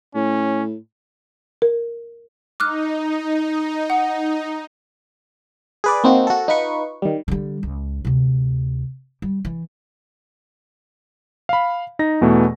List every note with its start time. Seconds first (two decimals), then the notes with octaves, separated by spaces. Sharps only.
0.15 A2 C#4
1.62 A#4
2.60 D#4 D6 F6 F#6
3.90 F#5
5.84 G#4 B4 D5
6.04 A#3 C4 D#4 F#4
6.27 F#4 A4
6.48 D#4 F4 B4 C#6
7.02 D#3 G3
7.28 D3 G3
7.63 C#2
8.05 D2 C3
9.22 G3
9.45 E3
11.49 F5 B5
11.99 D#4 A#6
12.21 E2 B2 E3 A3